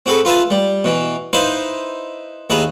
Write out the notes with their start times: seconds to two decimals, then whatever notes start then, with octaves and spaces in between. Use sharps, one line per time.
0.06 C4 F#4 G#4 A4 B4
0.25 F4 B4 E5 G#5 A5
0.50 G3
0.84 B2 E3
1.33 D#4 E4 B4 C5 F5
2.50 D#2 E4 G#4 B4 A#5